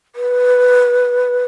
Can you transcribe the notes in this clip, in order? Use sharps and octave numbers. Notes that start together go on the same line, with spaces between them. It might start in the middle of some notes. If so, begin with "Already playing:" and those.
B4